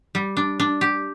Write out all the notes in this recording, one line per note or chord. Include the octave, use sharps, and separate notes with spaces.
G3
D4
D4
G4